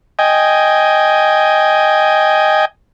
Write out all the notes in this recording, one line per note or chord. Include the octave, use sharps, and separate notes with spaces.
D#5 G5 G#5